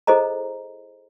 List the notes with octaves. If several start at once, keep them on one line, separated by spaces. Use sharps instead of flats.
E4 G#4 A4 C5 D#5 A#5